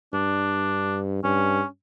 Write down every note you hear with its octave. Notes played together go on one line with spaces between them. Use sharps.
G2 D4
G2 C#4